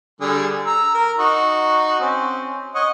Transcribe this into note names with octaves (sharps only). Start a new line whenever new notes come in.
D3 G3 G#4
A#5 E6
A#4
D#4 F#4
C4 C#4
C#5 D#5 F#5